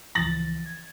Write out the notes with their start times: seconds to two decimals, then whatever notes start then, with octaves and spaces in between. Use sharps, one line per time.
0.15 C#2 E3 F3 A6 A#6 F#7
0.66 G#6